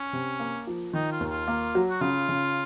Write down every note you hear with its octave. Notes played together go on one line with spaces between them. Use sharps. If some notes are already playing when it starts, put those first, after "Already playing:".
Already playing: C#4
C3
A#3
F3
D#3 D#4
F4
D#2
F4
A#3
F#3
F#4
C#3 F4
C#3